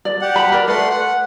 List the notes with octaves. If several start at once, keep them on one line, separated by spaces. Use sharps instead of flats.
D5
G4 F#5
B5
A#4 D5
A3 B4 F#5 C6
F#5